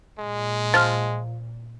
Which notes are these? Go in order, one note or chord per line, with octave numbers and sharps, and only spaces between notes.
A#2 G#3
F3 F6 A6